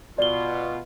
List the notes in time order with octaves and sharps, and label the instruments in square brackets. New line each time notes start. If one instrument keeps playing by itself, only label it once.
[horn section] B2 F4 [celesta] D5 G7